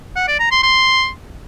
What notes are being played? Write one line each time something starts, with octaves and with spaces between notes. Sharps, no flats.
F#5
D5
A#5
C6
C6